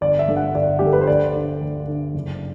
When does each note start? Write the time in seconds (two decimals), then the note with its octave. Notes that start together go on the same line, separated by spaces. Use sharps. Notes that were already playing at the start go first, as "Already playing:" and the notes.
0.01 G1 D5
0.19 E5
0.28 G2 D3
0.37 F#5
0.55 G1 D5
0.79 G4
0.81 G2 D3 A4
0.93 B4
1.01 C5
1.07 D2 D5
1.35 D3
1.61 D2
1.87 D3
2.14 F#1